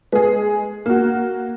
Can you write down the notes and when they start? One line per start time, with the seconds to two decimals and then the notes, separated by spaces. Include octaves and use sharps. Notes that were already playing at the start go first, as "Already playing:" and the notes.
0.12 G#3 G#4 B4
0.86 A#3 F#4